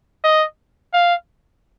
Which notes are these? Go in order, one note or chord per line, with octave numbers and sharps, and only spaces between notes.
D#5
F5